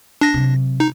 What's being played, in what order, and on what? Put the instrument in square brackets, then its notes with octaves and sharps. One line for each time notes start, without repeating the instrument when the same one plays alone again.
[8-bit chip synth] D4 A#6
[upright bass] C3 F#3
[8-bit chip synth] D#4